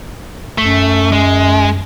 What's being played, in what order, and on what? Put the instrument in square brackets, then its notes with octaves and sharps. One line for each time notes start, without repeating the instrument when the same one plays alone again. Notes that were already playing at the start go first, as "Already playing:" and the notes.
[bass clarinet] F#2 [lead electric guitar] A3
[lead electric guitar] G#3